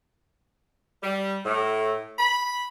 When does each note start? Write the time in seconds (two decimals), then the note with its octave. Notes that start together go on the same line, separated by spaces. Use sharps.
1.03 G3
1.45 A2
2.18 B5